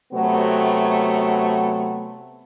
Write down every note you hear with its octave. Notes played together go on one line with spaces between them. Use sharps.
C3 F#3 A3 B3